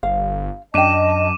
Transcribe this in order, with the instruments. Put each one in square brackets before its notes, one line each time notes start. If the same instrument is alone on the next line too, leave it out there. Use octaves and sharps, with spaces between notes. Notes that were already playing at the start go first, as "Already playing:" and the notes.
[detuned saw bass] G1 [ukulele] F5
[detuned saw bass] F#2 [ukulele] D4 G5 [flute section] D#5 A5 [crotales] D6 D#7 E7